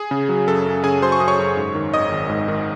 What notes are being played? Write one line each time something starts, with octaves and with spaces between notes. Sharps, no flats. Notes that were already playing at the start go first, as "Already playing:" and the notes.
Already playing: G#4
C#3
F#3
F#2 A4
F#2
C#3 G#4 G#5
F#3 C5 C6
C#6
F#2 D#6
C#5 C#6
F#2
G#2
D#3
G#1 D#5 D#6
G#1
G#2
D#3